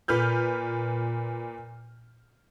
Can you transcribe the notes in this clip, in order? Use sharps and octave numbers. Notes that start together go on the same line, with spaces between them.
A#2 B4 F6 G6